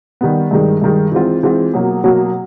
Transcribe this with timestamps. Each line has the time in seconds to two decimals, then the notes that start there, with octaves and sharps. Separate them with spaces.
0.21 D#3 G3 B3
0.51 G2 D#3 G#3
0.82 G2 D#3 G#3
1.12 E3 G#3 C4 F4
1.43 E3 G#3 C4 F4
1.74 B2 F#3 A#3
2.04 B2 F#3 A#3